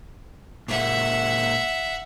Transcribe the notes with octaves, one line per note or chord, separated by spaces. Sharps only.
A#2 G#3 A#3 E5 F#5